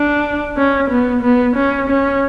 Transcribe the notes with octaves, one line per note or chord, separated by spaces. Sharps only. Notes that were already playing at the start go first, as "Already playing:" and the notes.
Already playing: D4
C#4
B3
B3
C#4
C#4